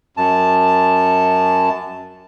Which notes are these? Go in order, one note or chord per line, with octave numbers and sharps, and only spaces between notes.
F#2 A5